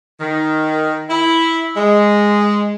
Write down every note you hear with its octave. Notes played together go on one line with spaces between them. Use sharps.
D#3
E4
G#3